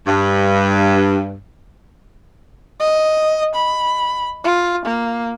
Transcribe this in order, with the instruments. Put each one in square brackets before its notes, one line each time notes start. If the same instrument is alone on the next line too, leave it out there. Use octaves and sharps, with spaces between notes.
[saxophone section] G2
[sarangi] D#5
B5
F4
A#3